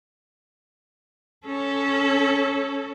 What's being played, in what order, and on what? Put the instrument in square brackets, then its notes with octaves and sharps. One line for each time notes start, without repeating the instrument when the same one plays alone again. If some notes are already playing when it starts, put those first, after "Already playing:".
[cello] C#4 A4